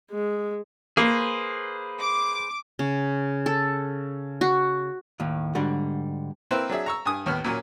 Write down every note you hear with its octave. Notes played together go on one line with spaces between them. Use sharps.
G#3
A#3 G#4 B4 C5
D6
C#3
A4
F#4
D#2 A2
G#2 D3 G3 F#4
A#3 C4 E4 B4 C5
F#3 D4 G#4 E5
A#5 C#6 E6
G2 G#5 D#6
D#2 A2 B3 F6
A#2 F#3 C#4 A#4